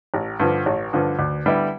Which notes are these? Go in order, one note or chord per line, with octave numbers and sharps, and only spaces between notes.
A1
G2 D3 F3
A1
G2 D3 F3
D2
D3 G3 B3 E4